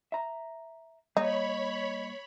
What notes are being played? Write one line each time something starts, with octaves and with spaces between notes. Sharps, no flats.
E5 A#5
G3 A#3 D#4 C#5 D#5 B5